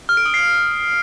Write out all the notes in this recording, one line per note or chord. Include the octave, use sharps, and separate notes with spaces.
F6
D7
D#6
C7